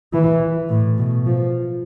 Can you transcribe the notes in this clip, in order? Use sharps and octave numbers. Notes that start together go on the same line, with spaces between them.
E3
A2
B2
F3